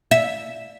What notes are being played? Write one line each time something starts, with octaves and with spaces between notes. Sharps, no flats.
E5